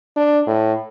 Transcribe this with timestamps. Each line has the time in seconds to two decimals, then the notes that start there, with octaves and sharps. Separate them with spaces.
0.17 D4
0.47 A2